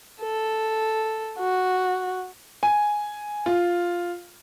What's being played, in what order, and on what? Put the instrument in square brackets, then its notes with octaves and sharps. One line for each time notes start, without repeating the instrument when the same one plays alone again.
[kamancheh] A4
F#4
[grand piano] G#5
F4